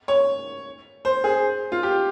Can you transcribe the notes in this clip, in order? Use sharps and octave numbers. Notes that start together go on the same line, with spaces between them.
C#5
C5
G#4
F4
G4